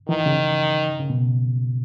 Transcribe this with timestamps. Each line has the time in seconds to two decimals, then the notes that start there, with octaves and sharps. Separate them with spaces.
0.09 D#3 E3
0.26 C#3
1.00 C#3
1.10 B2